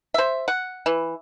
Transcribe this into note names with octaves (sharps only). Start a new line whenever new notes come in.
C5 E5
F#5
E3